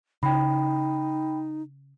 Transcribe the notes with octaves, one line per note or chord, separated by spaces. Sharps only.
C#3 D#4 G5 B5